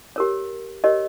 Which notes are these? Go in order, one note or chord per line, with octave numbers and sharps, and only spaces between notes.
G4 A#4 C#5
G4 A#4 C#5 D#5